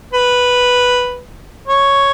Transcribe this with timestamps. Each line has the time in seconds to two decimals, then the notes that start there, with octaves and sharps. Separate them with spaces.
0.13 B4
1.67 C#5